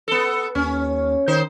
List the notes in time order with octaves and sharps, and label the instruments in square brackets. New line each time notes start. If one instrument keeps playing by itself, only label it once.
[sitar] B3 A4
[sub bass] D#2 [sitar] C#4
[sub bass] D#3 [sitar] D#4 C5